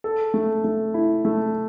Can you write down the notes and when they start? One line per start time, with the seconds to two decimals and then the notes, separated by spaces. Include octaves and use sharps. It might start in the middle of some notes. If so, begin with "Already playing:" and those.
0.04 A4
0.34 A3
0.64 A3
0.94 E4
1.25 A3